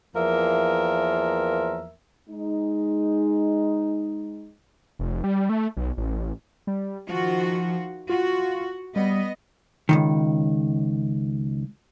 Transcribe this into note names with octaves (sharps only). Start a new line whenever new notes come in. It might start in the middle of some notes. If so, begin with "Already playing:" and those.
E2 F3 A#3 A#4 E5
G#3 D#4
F1
G3
A3
B1
A1
G3
D#3 F3 F4 F#4
F4 F#4
G3 B3 D#5
C#2 G#2 D#3